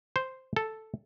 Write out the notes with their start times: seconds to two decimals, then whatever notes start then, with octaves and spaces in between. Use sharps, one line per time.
0.16 C5
0.56 A4